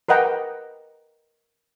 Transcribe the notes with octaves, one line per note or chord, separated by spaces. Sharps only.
A#4 B4 D#5 F#5 G5 A#5